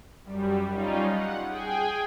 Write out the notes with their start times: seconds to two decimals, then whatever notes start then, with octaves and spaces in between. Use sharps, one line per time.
0.24 F#2 G3
0.70 G3 C#4 D#4 F4
1.09 F#5
1.47 G#4 G5 G#5